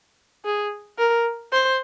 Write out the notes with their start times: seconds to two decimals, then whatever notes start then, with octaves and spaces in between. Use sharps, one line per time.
0.45 G#4
0.99 A#4
1.53 C5